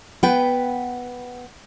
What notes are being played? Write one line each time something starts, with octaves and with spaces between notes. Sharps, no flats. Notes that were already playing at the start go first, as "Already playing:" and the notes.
B3 B4 G5